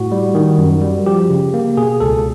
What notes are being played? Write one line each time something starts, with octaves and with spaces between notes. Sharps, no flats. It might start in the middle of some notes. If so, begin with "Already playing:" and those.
Already playing: A2 F#4
G3
D#3
F#2
G3
F3 G4
C#3
A#3
B2 G#4
C#2 A4